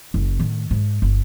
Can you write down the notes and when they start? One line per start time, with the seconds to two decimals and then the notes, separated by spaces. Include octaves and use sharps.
0.14 F#1
0.39 A2 D#3
0.71 G#2
1.02 G1